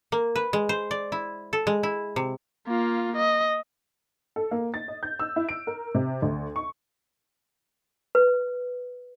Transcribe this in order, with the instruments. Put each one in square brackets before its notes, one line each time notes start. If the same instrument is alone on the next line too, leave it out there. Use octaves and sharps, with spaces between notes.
[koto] A#3
B4
G#3
C5
D5
E4
A4
G#3
E4
C3
[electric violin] A#3 F4
D#5
[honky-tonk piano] A4
A#3
A6
D#5
G6
E6
E4
D7
A#4
C3
D2
C#6
[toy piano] B4